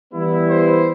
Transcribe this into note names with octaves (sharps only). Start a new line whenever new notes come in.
E3 G3 B3 E4
C5